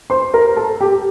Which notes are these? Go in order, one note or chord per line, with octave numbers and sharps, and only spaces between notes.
C5 C6
A#4 A#5
A4 A5
G4 G5